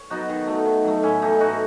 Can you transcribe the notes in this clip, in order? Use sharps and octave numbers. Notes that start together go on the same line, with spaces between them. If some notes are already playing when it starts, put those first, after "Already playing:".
Already playing: C#5
F#3 B3 D#4 F#4
D#3
F#3 A3
D#3
F#3 A3
A2 C#4 E4
E3 A3 D#4
A2 D#4 F#4